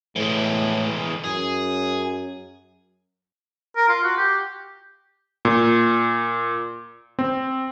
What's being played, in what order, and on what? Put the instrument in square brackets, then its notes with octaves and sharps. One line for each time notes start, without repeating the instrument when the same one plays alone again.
[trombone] A2 [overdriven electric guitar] E3 G#3
[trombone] F#2 [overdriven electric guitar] G#4
[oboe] A#4
F4
F#4
G4
[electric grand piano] A#2
C4